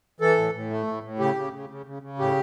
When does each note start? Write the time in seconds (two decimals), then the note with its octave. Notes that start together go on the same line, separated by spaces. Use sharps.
0.20 E3 A4
0.37 A2
0.54 A2
0.70 A3
0.87 A2
1.04 A2
1.19 C#3 G4
1.36 C#3
1.53 C#3
1.69 C#3
1.86 C#3
2.02 C#3
2.19 A2 G4